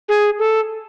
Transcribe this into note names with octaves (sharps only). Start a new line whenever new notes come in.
G#4
A4